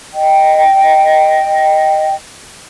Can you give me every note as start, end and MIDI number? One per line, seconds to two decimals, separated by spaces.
0.14 2.12 75
0.14 2.12 79